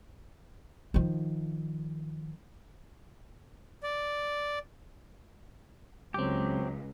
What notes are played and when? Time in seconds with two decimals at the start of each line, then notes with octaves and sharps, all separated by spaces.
0.94 D#3 F3
3.83 D5
6.14 C#2 F#3 C4 G4